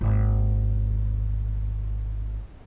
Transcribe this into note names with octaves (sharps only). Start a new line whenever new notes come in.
G#1 D#2